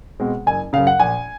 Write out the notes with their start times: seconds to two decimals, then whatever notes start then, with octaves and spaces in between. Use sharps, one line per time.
0.20 B2 G#3 C4
0.46 F#1 G#5
0.73 F#2 C#3 F5
0.87 F#5
1.00 A#1 G#5